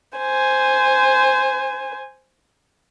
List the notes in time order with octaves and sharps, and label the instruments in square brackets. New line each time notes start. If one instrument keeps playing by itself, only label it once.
[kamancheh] C5 G#5